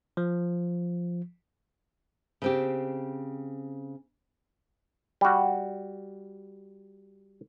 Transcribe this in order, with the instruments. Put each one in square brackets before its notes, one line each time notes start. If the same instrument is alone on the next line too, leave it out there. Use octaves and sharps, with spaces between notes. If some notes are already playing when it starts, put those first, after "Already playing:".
[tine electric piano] F3
[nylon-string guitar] C#3 C4 G4
[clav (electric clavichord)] G3 F#4